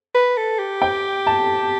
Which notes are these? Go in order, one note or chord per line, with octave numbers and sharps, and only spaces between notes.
B4
A4
G4
G5
A5